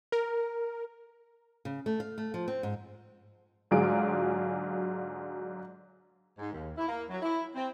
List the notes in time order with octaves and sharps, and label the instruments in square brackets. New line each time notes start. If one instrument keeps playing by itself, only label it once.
[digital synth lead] A#4
[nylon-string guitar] C#3
A3
F5
A3
F3
C4
G#2
[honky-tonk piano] G#2 D3 F#3 F4 G#4 D7
[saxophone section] G#2
D#2
E4
A#3
F#3
E4
C4